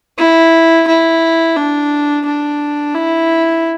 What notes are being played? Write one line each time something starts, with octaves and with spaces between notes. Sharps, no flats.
E4
E4
D4
D4
E4